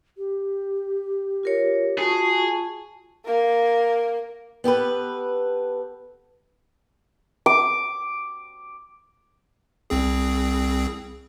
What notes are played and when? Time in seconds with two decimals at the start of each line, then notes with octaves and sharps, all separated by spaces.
0.18 G4
1.43 F4 A#4 C#5
1.99 F4 F#4 G#4 A5 C#6
3.25 A#3 A#4
4.64 B3 G4 A4 B4
7.46 D6
9.90 C2 C4 G#4